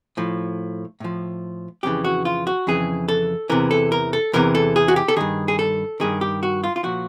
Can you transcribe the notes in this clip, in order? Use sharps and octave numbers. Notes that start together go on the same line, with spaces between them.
A2 F3
A2 F3
F2 C#3 E3 G4
F#4
F4
F#4
F2 C#3 E3 G#4
A4
E2 C3 E3 A#4
A4
A#4
A4
E2 C3 E3 A#4
A4
G#4
F#4
G4
A4
G2 D#3 G#4
G#4
A4
G2 D#3 G#4
G4
F#4
F4
F4
A#2 F3 F#4